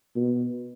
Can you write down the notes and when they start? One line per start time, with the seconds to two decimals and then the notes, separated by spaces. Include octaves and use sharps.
0.16 B2